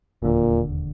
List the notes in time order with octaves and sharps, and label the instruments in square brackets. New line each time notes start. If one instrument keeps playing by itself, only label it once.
[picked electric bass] E1 D#2 D3 [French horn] A#2